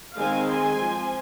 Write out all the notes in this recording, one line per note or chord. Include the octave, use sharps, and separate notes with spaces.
D#3 G#3 C4 F5 G#5
G#5 C6
F3 C4